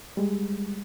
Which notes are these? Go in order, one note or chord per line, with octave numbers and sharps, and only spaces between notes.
G3 G#3